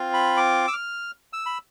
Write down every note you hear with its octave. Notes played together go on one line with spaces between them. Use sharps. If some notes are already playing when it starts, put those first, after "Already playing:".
Already playing: C4 F4
B5
D6
E6
F6
E6
B5